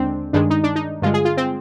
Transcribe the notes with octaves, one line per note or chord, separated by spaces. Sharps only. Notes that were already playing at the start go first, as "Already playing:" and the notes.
Already playing: D#2 D3 G#3 C4 D4
G2 D#3 G#3 D4
D#4
D4
D#4
G2 D3 G#3 F4
G#4
F4
C4